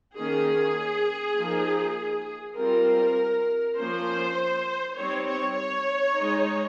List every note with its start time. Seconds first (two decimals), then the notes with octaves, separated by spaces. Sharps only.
0.17 D#3 A#3 C#4 G#4
1.37 F3 A#3 D#4
2.57 G3 C4 F4 A#4
3.77 F3 A#3 C#4 C5
4.96 G3 C4 D#4 C#5
5.27 C#5
5.57 C#5
6.17 G#3 D#4